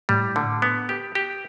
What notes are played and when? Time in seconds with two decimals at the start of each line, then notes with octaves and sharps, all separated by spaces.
0.09 A2 G3
0.36 D3
0.62 B3
0.89 G4
1.15 G4